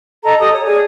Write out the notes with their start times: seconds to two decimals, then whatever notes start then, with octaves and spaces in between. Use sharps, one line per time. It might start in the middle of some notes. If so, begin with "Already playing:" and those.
0.24 A4 D#5 A5 A#5
0.40 G4 A4 D#5 D#6
0.52 C#5
0.65 G#4 D5 G#5